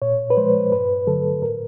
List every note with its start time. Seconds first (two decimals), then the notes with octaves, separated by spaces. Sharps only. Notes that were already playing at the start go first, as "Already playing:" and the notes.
0.02 A#2 C#5
0.30 B4
0.37 F3 G#3 C5
0.72 G2 B4
1.07 D3 F#3 A3 A4
1.42 A2 A#4